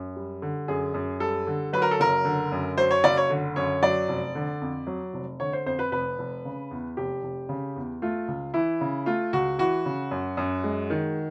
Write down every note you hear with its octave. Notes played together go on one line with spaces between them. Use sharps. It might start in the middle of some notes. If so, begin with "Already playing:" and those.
Already playing: F#2
G3
D3
F#2 G#4
F#2
G3 A4
D3
F#3 B4
A#4
A4
F#1 A#4
D3
F#2
F#3 C5
C#5
F#1 D5
C#5
D3
F#2 C#5
F#3 D5
F1
D3
F2
F#3
F1
D3 C#5
C5
F2 C5
B4
F1 B4
F1
C#3
E2
F1 G4
F1
C#3
E2
A3 F4
C#2
E3 E4
C#3
A3 F4
C#2 F#4
E3 F#4
C#3
F#2
F#2
G#3
D#3